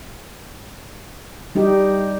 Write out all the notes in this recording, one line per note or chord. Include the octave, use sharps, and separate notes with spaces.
G3 D#4 G4